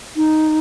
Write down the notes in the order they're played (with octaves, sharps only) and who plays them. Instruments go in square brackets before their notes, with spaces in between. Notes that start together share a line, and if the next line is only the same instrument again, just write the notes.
[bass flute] D#4